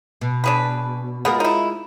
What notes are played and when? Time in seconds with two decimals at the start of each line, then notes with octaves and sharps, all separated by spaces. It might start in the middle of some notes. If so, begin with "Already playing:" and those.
0.21 B2
0.44 D4 G#4 B4
1.25 B2 G#3 B3 F4 A#4
1.40 D#4 E4